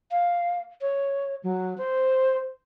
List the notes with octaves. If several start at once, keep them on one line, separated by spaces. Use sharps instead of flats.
F5
C#5
F#3
C5